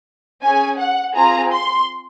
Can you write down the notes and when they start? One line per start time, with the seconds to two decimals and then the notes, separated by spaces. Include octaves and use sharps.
0.42 C#4 G#4 G#5
0.79 F#5
1.15 C4 F4 G#4 A#5
1.53 C6